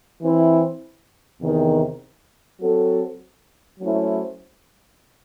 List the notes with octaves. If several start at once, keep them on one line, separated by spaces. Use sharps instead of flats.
E3 C4 E4 C5
E2 C3 D#3
F#3 C4 F#4 A4
F#3 A3 C#4 E4 C5